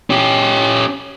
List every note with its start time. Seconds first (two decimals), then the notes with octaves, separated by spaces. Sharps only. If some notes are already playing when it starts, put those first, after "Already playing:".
0.10 C#4 G4